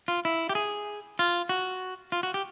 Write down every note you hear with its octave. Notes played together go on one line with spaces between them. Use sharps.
F4
E4
G4
G#4
F4
F#4
F4
F#4
G4